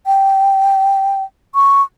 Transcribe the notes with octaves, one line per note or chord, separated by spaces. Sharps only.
G5
C#6